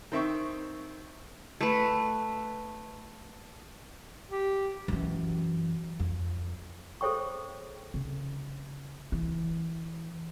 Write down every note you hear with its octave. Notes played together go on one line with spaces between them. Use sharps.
D#3 C4 E5 C#6
A3 B4
G4
F#2 E3
F2
G#4 A4 C5 C#5 G5 C#6
C#3
E3